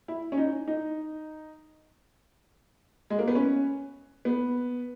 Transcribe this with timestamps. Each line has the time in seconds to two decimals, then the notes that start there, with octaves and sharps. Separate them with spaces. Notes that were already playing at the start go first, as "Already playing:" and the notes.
0.08 E4
0.32 C#4
0.38 D#4
0.68 D#4
3.10 G#3
3.19 A#3
3.28 B3
3.35 C#4
4.25 B3